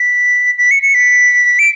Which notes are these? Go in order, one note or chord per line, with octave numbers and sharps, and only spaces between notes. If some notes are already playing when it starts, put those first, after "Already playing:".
Already playing: B6
B6
C#7
C#7
B6
D7